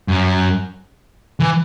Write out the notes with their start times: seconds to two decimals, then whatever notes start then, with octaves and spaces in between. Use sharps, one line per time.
0.08 F#2
1.40 E3